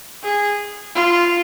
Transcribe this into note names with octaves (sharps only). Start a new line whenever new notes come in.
G#4
F4